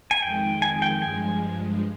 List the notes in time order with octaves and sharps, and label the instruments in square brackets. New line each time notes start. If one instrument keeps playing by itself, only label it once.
[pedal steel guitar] G#5
[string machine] F2 D#3 G#3 [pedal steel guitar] G5
[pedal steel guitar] G#5
G5
[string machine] G2 F3 G#3 [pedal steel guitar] G#5